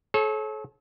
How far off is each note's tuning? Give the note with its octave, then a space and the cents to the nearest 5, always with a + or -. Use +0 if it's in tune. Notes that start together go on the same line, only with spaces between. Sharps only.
A4 -40 C#5 -30